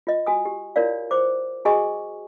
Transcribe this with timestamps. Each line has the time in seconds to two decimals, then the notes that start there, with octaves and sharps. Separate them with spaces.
0.07 F4 D#5
0.26 F#4 G#5 D#6
0.45 G4
0.76 E4 F4 A#4 C#5 D5 F5
1.11 C5 D6
1.65 F#4 G#4 D#5 G#5 C#6 D#6